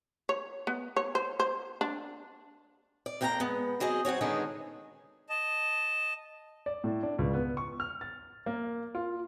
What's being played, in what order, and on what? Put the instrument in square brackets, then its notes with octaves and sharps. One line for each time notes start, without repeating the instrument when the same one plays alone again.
[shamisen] C#5
B3
C#5
C5
C5
D4
[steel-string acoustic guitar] D5
F2 A#3 G5 A5 A#5
G#3 B3
F#3 C4 G#4 D#5
F#3 C4 F#4 C#5
D3 D#3 G#3 B3 C#4 D4
[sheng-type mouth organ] D#5 A5
[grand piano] D5
A2
D4
C#2
B3
C#6
F6
A6
A#3
F4